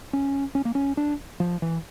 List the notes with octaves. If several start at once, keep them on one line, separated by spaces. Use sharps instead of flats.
C#4
C#4
A#3
C#4
D4
F3
E3